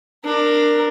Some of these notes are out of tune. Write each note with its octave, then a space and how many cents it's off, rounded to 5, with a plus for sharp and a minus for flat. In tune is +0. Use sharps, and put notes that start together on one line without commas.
D4 +15 A#4 +0